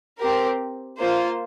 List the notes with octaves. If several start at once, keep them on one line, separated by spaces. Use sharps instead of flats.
C4 G4 A#4
A#3 F4 C5